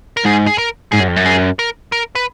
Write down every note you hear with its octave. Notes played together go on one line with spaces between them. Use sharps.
A#4
G#2 G#4
G#4
A#4
G#2 G#4
F#2
F2
F#2
G#4
A#4
A#4
B4